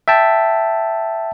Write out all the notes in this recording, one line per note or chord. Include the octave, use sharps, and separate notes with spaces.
E5 G5 A5